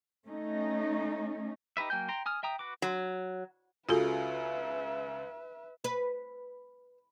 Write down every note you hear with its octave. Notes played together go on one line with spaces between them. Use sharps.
A3 C#4 D#4
D#4 G4 B4 E5
F#3 A#3 G5 G#5 G6
G5 A#5 C6
G#5 D#6 F6
E5 G5 A#5 D#6
F#4 B4 D6
F#3
C#2 C#3 F4 F#4 A4 B4 E5
B4